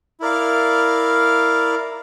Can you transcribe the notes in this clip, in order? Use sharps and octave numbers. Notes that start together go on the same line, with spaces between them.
E4 A#4 D5 F5